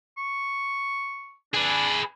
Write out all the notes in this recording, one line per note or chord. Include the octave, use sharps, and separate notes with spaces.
C#6
D4 G#4 B4